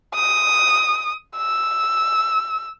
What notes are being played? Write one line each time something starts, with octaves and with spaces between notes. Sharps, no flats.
D#6
E6